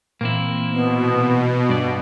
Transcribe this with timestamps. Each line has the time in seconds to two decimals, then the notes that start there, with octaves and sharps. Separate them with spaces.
0.21 A#2 E3 A#3 C4 E4
0.72 B2 B3
1.69 G2 D5